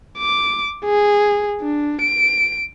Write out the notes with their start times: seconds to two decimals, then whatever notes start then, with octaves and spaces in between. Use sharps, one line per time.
0.18 D6
0.85 G#4
1.61 D4
2.02 D7